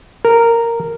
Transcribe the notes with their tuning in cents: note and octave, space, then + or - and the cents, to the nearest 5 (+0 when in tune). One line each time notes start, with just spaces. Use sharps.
A#4 -10